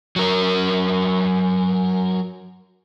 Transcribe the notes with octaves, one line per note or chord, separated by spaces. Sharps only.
F#3 A#4